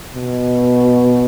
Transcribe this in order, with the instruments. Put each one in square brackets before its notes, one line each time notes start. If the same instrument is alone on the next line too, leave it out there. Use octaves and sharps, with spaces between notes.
[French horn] B2